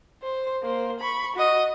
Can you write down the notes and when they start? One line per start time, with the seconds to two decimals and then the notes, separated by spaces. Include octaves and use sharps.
0.23 C5
0.63 A#3 C5
1.00 B5 C#6
1.36 F#4 D#5